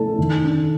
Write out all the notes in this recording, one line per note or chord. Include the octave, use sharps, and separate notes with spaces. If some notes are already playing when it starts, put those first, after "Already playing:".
Already playing: A3 A4 A5
D#3
D4